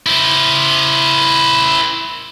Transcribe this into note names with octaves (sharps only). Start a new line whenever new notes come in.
E4 C5